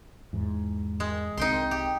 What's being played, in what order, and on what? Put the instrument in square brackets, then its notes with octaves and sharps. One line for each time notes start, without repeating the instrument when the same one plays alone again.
[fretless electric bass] E2 G#2
[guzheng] G#3
[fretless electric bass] C2 C4 [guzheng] D#4 G5 C6
[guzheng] G4